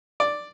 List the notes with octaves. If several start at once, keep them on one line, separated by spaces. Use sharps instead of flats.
D5